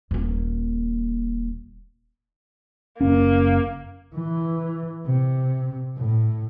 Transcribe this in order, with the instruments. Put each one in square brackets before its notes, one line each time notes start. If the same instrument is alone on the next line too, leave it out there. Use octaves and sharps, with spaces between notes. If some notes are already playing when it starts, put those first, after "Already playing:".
[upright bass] D#1 A#3
[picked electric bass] F#1 C#4 [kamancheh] A#3
[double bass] E3
C3
A2